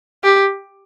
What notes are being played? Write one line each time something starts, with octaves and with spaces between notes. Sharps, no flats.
G4